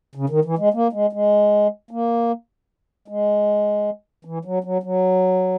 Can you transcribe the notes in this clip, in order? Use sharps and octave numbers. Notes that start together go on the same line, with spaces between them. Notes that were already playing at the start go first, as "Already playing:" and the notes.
C#3
D#3
E3
G#3
A#3
G#3
G#3
A#3
G#3
E3
F#3
F#3
F#3